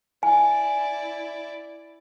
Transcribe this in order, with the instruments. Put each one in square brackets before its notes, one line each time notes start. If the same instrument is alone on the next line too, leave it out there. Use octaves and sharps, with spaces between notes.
[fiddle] E4 D5 [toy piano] G#5